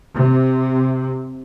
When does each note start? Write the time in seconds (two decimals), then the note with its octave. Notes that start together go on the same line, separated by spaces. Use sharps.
0.15 C3